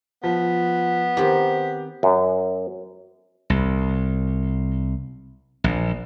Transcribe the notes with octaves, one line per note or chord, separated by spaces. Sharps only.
F3 B3
D#3 C4 G4
F#2
C2
A#1